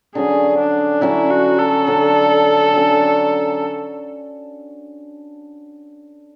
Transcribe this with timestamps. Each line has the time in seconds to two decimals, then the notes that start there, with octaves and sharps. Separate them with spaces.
0.15 D3 F#3 C#4 G#4
0.59 D4
1.01 D3 F#3 C#4 E4
1.30 F#4
1.59 A4
1.87 D3 F#3 C#4
2.73 D3 F#3 C#4